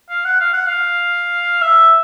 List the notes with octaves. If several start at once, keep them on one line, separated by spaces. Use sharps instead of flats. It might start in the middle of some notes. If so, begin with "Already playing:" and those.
F5
F#5
F5
F#5
F5
E5